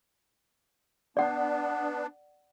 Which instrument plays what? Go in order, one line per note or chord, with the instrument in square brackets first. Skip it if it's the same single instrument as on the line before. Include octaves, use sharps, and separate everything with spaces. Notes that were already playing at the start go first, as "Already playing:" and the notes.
[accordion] B3 D4 [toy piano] D5 F#5